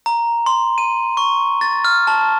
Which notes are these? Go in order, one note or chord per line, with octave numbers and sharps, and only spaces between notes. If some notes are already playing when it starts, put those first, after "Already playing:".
A#5
C6
D#7
C#6
A6
F6
A5